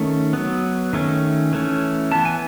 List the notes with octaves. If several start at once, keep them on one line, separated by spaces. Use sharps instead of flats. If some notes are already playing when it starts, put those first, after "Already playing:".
Already playing: D#3 A3 C#4
F#3 B3
D#3 A3 C#4
E3 A3 C#4
E3 B3 A5
G#5